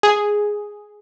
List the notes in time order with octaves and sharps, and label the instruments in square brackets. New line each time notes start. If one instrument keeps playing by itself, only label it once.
[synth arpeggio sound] G#4